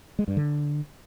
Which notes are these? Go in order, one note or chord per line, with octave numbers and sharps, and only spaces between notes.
G#3
G2
D3